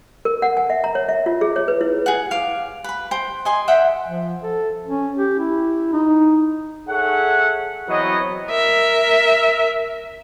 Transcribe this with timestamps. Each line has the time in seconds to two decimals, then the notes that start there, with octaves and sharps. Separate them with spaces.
0.25 A#4
0.42 F#5
0.57 G#5
0.70 E5
0.84 A#5
0.95 C#5
1.09 E5
1.26 F4
1.41 G#4
1.56 C#5
1.68 B4
1.81 E4
2.06 G#4 F#5
2.31 F5 D6
2.84 B4 B5
3.11 C5 G5
3.45 D#5 G#5 C6
3.68 E5 F#5 G5
4.05 F3
4.42 A4
4.86 C#4
5.17 G4
5.39 E4
5.92 D#4
6.89 G#4 A4 C#5 E5 F#5
7.88 E3 F#3 B3 C4 C#5 D#5
8.49 A#4 E5